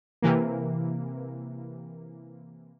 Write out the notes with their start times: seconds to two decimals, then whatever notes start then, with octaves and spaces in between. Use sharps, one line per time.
0.22 C3 E3 A#3